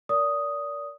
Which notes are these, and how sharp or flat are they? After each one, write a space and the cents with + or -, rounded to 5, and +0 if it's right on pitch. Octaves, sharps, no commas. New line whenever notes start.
A#4 +10 D5 -25 D#6 +0